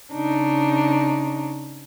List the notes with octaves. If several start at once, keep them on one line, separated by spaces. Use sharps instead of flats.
C#3 D4 D#4